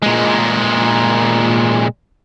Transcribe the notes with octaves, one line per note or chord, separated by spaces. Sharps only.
A#2 G#3